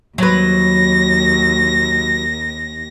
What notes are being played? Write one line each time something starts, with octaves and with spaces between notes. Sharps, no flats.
D#2 F#3 B4 A#6